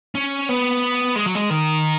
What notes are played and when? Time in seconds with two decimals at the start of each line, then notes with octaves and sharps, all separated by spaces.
0.15 C#4
0.49 B3
1.16 G#3
1.26 F#3
1.35 G#3
1.50 D#3